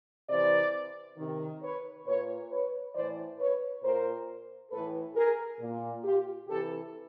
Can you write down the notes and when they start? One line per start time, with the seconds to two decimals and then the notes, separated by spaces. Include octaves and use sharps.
0.29 C3 E3 C5 D5
1.17 C3 D#3
1.62 B4 C#5
2.05 A#2 B4 C#5
2.50 B4 C#5
2.94 A2 E3 C5 D5
3.38 B4 C#5
3.83 A#2 A#4 C5
4.71 A2 E3 A4 B4
5.15 G#4 A#4
5.59 A#2
6.03 F4 G4
6.47 C3 E3 G4 A4